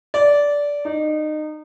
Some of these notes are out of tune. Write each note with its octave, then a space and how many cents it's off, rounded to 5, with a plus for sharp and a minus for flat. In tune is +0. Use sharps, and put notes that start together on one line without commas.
D5 -15
D#4 -25